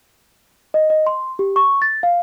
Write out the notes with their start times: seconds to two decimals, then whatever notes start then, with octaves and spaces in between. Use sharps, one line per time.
0.74 D#5
0.90 D#5
1.07 C6
1.39 G4
1.56 C#6
1.82 A6
2.03 F5